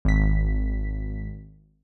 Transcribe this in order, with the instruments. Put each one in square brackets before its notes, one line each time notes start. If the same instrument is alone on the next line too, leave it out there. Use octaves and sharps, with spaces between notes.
[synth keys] G#1 B6